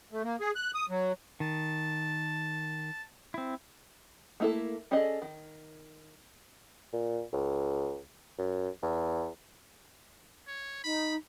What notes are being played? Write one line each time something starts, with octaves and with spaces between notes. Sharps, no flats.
A3
A#3
G#4
F#6
D#6
F#3
D#3 A5
C4 E4
A3 A#3 E4 F#4 A4
C#4 G#4 A4 D5 D#5
D#3
A#2
C#2
F#2
E2
C#5
D#4 B5